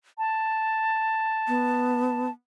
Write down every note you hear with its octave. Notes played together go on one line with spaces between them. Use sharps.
A5
B3